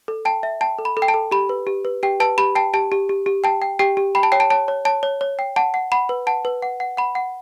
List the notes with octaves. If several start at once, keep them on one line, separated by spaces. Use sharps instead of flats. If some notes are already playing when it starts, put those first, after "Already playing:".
A4
G5 A5
E5
G5 A5
A4
B5
A4
G5
A5
A4
G4 B5
B4
G4
B4
G4 G5
B4 A5
G4 B5
G5 A5
G4 A5
G4
G4
G4
G5 A5
G5
G4 G5
G4
G5 B5
A5
C#5 G5
A5
C#5 A5
C#5
C#5 A5
C#5
C#5
G5
F#5 A5
F#5
F#5 B5
B4
F#5 A5
B4
F#5
F#5
F#5 B5
F#5